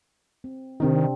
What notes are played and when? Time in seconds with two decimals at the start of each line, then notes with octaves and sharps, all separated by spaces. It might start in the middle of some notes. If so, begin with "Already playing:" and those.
0.44 C4
0.80 C3 D#3 C4 D4